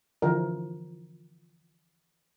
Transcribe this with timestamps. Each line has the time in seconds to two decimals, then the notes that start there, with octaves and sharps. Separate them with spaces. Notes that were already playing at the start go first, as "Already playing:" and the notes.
0.22 D3 E3 F3 A#4